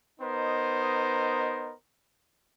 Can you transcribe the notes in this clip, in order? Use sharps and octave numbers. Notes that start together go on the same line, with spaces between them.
B3 D#4 A#4 C5 D#5